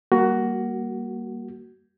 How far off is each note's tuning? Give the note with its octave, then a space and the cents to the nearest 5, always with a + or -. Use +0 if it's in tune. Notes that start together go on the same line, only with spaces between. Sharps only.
G3 +0 A#3 +5 F#4 +15